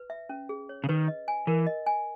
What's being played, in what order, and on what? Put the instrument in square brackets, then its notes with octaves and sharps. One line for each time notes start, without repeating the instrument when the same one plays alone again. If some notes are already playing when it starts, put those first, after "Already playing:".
Already playing: [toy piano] B4
E5
C#4
G#4
C#5
[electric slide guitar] C#3
[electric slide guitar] D#3 [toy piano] B4
[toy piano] D#5
G#5
[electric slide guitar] E3 [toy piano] A#4
[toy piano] D#5
G#5